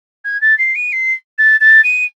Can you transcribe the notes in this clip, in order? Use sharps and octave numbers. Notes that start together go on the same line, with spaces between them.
G#6
A6
C7
D#7
C7
A6
A6
D#7